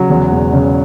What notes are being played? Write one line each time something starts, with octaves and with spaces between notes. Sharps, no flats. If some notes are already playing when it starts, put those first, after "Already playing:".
Already playing: C#3 F#3
E2
E1
C#3